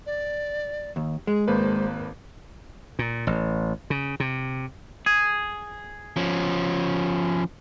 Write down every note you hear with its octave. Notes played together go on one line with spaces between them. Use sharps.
D5
D#2
G#3 G#4
G#1 A#3 B4 C5
A#2
A1
C#3
C3
G#4
F3 C#4